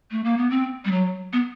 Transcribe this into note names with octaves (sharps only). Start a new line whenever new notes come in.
A3
A#3
B3
C4
G3
F#3
B3